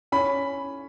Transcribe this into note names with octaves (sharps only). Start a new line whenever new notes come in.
C#4 B5